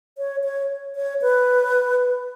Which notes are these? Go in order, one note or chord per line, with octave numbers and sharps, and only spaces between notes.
C#5
C#5
C#5
B4